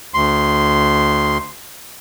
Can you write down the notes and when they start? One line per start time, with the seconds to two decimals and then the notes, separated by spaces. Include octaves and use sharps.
0.14 D2 C6